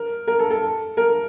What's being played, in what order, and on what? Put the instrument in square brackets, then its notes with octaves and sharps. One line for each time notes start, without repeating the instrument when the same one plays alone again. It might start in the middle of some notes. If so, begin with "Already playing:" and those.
Already playing: [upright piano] A#4
A#4
A4
A4
A#4